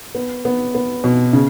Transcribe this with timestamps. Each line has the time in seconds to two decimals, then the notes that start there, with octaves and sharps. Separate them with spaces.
0.15 B3
0.45 B3
0.75 B3
1.04 B2
1.33 C#3